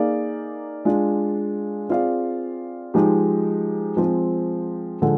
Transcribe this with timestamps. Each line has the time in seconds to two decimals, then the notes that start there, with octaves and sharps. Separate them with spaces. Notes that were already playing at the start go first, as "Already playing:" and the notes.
Already playing: A#3 D#4 G#4 D5 F5
0.85 G#3 D4 F4
1.89 C4 F4 G#4 D5 F5
2.94 F3 G#3 D#4 G4
3.97 F3 G#3 C4
5.02 D3 F3 G#3